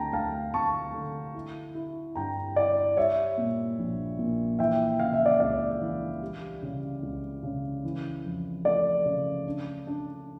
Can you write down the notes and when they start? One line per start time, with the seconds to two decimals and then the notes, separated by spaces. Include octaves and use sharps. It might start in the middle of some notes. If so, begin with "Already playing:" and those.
Already playing: D2 G5 A5 A#5
0.13 D2 F5 A5
0.54 D2 A5 C#6
0.94 D3
1.35 E4
1.75 E4
2.15 G2 G5 A#5
2.56 E4 D5
2.97 G3 C#5 E5
3.38 A#2
3.79 A#1
4.19 A#2
4.59 E3 E5 G5
5.00 C#3 F5
5.13 E5
5.25 D5 F5
5.40 C#2 D5 F5
5.82 E3
6.22 G3
6.63 C#3
7.03 C#2
7.43 C#3
7.84 E3
8.25 F2
8.65 A3 D5
9.06 C#3
9.46 D4
9.87 D4